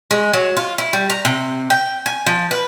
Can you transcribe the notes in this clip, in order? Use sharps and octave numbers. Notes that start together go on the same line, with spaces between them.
G#3
F#3
F4
E4
G3
A#5
C3
G5
G#5
F3
B4